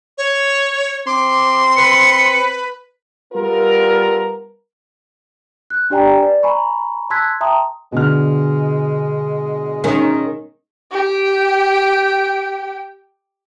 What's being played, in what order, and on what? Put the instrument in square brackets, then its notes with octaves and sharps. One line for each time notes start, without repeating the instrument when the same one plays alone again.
[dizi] C#5
[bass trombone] C4 [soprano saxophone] C6 [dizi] D6
[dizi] B4 [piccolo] C#7
[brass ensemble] G3 B3 F4 A4 A#4
[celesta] F#6
D4 G4 D5 G5 G#5 A#5
B4 D5
G#5 A#5 B5 C#6
A5 C6 E6 F#6 G#6 B6
E5 G5 A5 A#5 C6 D#6
[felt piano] B2 D3 F6 [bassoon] G#3
[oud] D#3 C#4
[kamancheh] G4 G5